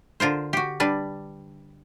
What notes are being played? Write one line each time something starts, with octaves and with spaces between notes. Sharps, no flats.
D3 F4 A#4 C5
F#4 G4
G3 D4 B4